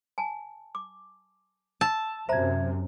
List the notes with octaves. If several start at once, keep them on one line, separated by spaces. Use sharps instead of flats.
G#5 A5
D6
A5 E6
F#2 C3 C5 E5 A#5 G#6